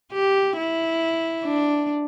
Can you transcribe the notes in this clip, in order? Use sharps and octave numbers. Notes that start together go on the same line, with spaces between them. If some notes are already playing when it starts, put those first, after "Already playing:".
G4
E4
D4